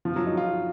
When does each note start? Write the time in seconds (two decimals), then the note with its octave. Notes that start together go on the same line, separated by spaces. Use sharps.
0.05 F3
0.16 F#3
0.27 D#4
0.37 F4